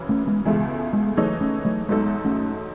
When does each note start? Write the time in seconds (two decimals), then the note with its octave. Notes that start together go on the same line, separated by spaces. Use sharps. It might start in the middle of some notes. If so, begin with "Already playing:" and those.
Already playing: F#2 C#3 E3
0.09 A3 C#4
0.27 G#3 B3
0.45 C#2 B2 E3 G#3 A3 E4 G#4
0.93 G#3 B3
1.17 E3 F#3 G#3 A3 D#4 A4 C#5
1.41 A3 C#4
1.65 F#3 A3
1.89 G#2 F#3 G#3 A3 B3 D#4 A4
2.25 A3 C#4